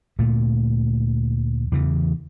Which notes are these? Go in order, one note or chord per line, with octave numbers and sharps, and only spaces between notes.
D2 A#2 A3
E2 C#3 E3